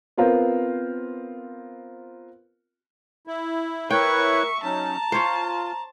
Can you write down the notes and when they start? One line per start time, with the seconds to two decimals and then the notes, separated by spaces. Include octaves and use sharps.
0.18 B3 C4 F4 A#4 C5
3.27 E4
3.91 E4 A#4 B4 C#5 E5 G5 C#6
4.64 F#3 C#4 D#4 A5 A#5
5.12 F4 C5 C#5